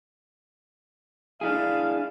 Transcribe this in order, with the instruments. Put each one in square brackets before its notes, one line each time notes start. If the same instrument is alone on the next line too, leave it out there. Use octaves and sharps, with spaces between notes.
[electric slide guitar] D4 E4 G#4 [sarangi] F5